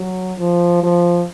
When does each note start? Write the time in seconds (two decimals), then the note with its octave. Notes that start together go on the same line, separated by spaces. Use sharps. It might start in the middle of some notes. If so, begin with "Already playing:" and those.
Already playing: F#3
0.38 F3
0.83 F3